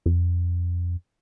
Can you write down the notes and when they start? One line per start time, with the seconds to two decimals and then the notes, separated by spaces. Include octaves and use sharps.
0.06 F2